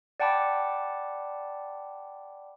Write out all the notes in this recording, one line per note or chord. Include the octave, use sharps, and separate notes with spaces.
D5 F#5 G5 A5 B5 D6